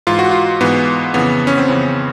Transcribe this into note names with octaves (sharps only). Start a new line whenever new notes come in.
G#2 E3 F4
F#4
F4
G#2 E3 B3
F2 C#3 E3 B3
C#4
C4
F2 C#3 E3 B3